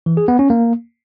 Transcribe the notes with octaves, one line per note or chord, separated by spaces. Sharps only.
E3
G#4
B3
C#4
A#3